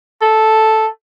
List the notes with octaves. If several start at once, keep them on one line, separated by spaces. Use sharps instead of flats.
A4